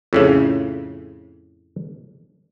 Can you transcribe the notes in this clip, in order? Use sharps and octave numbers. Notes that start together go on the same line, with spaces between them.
F2 A2 C#3